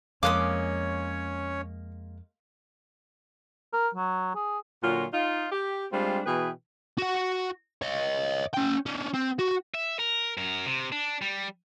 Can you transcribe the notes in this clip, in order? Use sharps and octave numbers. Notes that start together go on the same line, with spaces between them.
F2 G#3 A#3 C#4 C#5 F5 D6 D#6
A#4
F#3
G#4
A#2 D3 F#3 F4 F#4
D#4 F4
G4
G3 G#3 C4 D4 F4
B2 E3 G#4 B4 G5
F#4 F#5
C#5 D#5
C#4 G5
C#4 D4
C4
F#4
E5
A#4
F#2 A#4
C3
D4
G3